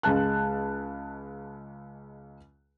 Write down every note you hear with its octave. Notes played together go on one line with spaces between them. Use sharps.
C#2 G#3 A5 F#6